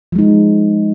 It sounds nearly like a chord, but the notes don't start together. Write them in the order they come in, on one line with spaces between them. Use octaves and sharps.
F3 G#3 D#4